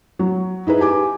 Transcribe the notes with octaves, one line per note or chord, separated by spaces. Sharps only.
F#3
D#4 E4 G#4 B4
G4 G#5 D6